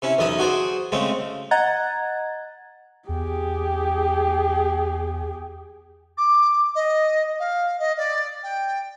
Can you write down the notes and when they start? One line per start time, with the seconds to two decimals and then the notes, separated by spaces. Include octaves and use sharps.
0.02 C3 C#4 E4
0.19 B1 E2 D#5 A5 B5
0.39 F#4 G#4 C5 D5
0.92 C#3 G#3 A3 C4
1.51 D#5 F#5 A#5 F#6 G#6 A6
3.09 E2 G4 G#4
6.17 D6
6.75 D#5
7.39 F5
7.79 D#5
7.97 D5
8.43 G5